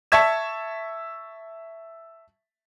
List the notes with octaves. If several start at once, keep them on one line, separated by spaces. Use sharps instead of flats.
E5 A5 C#6 G#6 B6 E7